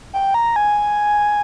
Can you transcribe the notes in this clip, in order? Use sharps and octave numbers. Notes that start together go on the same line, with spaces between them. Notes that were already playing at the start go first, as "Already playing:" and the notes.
G5
A#5
G#5